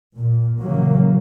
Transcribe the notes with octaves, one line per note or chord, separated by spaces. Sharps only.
A#2
C#3 E3 F#3 A#3